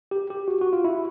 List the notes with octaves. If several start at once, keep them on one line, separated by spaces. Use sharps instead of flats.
G4
G4
F#4
F#4
F4
E4